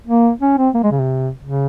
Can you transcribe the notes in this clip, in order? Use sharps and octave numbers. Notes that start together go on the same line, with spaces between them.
A#3
C#4
C4
A#3
G#3
C#3
C3
C#3